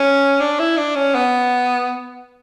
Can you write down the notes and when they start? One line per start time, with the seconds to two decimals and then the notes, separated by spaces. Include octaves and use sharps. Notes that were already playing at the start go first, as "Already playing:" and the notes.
Already playing: C#4
0.40 D4
0.60 E4
0.77 D4
0.96 C#4
1.15 B3